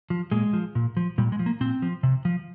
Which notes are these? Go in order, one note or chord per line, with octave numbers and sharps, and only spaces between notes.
F3
A#2 G#3
F3
A#2
F3
A#2 G3
G#3
F3
A#3
A#2 C4
F3
C3
F3